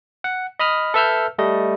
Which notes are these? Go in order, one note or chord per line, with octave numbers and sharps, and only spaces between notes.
F#5
D#5 B5 D#6 F6
A4 B4 E5 E6 F6 G6
G3 A3 D#5